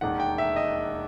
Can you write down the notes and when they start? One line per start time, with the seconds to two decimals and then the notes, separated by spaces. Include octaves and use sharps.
0.01 E1 D#2 D#3 F#5
0.20 G5
0.38 E5
0.56 D#5